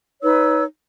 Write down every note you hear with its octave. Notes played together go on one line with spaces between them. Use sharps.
D#4 B4 C#5 E6